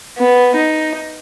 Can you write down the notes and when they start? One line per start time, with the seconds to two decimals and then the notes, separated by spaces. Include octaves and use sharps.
0.18 B3
0.56 D#4